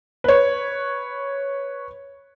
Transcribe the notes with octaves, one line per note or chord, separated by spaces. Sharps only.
B4 C#5